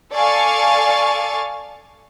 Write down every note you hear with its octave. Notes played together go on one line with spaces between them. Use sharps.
A4 D5 F5 G#5 C#6 A6